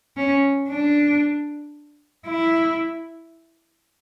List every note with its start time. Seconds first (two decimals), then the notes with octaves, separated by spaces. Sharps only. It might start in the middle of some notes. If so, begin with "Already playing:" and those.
0.17 C#4
0.70 D4
2.27 E4